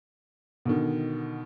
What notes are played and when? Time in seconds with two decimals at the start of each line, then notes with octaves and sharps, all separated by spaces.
0.65 B2 D3 D#3